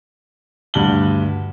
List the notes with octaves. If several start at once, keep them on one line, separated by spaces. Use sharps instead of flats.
D2 G2 F#7 G7